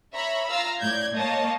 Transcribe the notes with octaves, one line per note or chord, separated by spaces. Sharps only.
C#5 E5 A#5 B5 C#6
F4 F5 A#5 E6
A2 D5 G6 G#6
A#3 C#5 D#5 A5